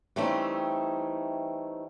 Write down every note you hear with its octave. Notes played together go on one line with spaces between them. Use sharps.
E3 G3 A3 C4 C#4 D#4